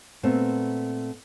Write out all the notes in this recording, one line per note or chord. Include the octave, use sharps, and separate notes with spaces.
A#2 A3 B3 C4